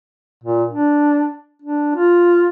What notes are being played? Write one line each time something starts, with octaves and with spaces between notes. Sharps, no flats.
A#2
D4
D4
F4